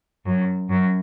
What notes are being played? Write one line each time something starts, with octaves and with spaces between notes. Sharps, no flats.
F#2
F#2